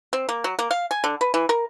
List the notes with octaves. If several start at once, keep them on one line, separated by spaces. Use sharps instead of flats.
C4
A#3
F#3
A#3
F5
G#5
D3
B4
E3
A#4